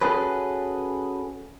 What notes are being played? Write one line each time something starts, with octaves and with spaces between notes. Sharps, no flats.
C#4 F#4 G#4 A4 B4